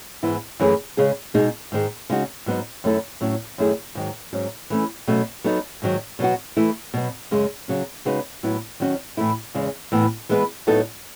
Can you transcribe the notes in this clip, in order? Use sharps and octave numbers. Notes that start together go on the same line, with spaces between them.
G#2 E3 B3 E4
F#2 E3 A3 C#4 G#4
C#3 G#3 C#4 G#4
B2 G#3 D#4 G#4
G#2 D#3 G#3
C#3 G#3 D#4 F#4
G#2 F#3 B3 D#4
F#2 D#3 A3 E4 A4
A2 F#3 C#4
F#2 D#3 A3 E4 G#4
G#2 D#3 F#3
G#2 F#3 C#4
E3 A3 C#4
B2 F#3 A3 C#4
F#3 B3 D#4 A4
G#2 D#3 F#3
B2 F#3 B3 F#4
E3 A3 E4
B2 F#3 B3
F#2 C#3 G#3 C#4
C#3 F#3 C#4
C#3 G#3 D#4 F#4 B4
A2 F#3 B3 E4
D#3 F#3 C#4 F#4
A2 E3 A3 E4
E2 C#3 G#3
A2 E3 B3
E3 G#3 B3 E4 B4
A2 F#3 B3 D#4 A4